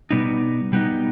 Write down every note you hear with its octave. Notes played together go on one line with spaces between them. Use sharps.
B2 G3 B3 D#4
B2 G3 B3 D#4